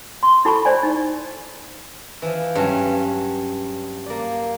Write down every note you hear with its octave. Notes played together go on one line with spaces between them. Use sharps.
C6
E4 F#4 A4 A5 B5 C#6
C5 D5 G#5
D#4
E3 F3
G2 F#3 C#4
A#3 D5